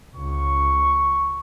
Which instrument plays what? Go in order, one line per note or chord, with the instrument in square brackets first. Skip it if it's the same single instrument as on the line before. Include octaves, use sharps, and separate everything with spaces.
[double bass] C#2 [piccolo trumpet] C#6